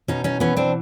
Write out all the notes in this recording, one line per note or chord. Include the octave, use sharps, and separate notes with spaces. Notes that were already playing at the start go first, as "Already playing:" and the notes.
B2 C#4 D#4
C#4 D#4
E3 B3 C#4
C4 D4